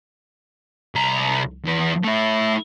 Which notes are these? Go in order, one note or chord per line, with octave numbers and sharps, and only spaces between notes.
C2 A#5
E2 B4
A3 E4